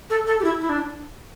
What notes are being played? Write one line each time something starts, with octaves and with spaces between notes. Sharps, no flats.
A4
A4
G4
E4
E4
D4